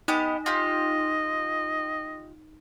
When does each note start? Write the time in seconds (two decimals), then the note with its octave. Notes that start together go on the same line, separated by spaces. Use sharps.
0.08 B3 D#4 G4 D#5
0.46 F4 G4 D#5